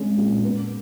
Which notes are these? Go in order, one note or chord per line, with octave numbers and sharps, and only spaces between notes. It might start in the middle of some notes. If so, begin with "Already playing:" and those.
Already playing: G#3 C#4
A#2
B3